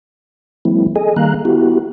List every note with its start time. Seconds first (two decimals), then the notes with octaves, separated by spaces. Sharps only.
0.65 E3 F#3 G#3 A#3 C4 E4
0.96 G#4 A4 D#5 G#5
1.16 D#3 G3 A#3 F5 A#5 F#6
1.45 B3 E4 F#4 G4